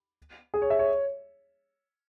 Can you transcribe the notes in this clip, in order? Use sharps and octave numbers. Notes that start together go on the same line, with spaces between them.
G#4
C#5
E5
C#5